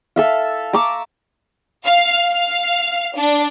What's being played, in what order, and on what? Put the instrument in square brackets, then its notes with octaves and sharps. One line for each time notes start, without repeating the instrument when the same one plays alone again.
[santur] A4 E5 F5
A#5 C#6 D6 E6
[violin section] F5
F5
D4